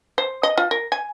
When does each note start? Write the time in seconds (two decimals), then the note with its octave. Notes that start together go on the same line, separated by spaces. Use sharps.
0.18 C5
0.43 D#5
0.57 F4
0.71 A#4
0.92 G#5